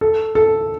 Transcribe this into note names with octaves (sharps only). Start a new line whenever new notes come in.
A4
A4